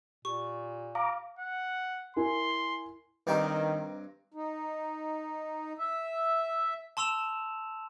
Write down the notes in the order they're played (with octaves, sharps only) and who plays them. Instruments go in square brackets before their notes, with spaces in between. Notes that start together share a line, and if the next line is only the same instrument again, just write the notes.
[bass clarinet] A#2 [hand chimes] G4 [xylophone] C#6
[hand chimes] F5 [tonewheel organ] A#5 D6
[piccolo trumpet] F#5
[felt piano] E4 A#4 G#5 [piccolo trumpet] C6
[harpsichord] G2 C4 G4 [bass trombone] D#3 [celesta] B4 D#5 A#5
[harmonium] D#4
E5
[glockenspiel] A5 C6 E6 E7 F7